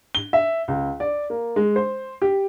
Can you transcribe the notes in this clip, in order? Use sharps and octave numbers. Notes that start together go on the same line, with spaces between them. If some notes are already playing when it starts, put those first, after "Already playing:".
G7
E5
C#2
D5
A#3
G#3
C5
G4